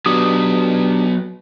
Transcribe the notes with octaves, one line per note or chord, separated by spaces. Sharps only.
F#3 B3 D4 G4 D#6